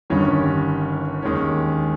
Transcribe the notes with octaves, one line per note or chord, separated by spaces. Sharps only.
G1 G2 D#3 G3 C#4
D#2 D#3 G#3 C#4